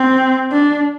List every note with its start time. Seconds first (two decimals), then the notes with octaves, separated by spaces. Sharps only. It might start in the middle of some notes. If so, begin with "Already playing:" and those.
Already playing: C4
0.52 D4